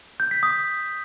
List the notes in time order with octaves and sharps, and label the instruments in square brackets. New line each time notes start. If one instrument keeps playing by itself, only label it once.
[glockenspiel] G6
B6
D#6